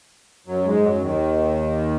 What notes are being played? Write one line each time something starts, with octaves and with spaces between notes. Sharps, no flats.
F#2 F#3
G#2 G#3
F#2 F#3
D#2 D#3